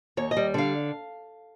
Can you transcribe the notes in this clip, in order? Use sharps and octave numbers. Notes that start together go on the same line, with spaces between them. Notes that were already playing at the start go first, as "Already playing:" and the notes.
D#2 C#5
D#5
G3
D3 F5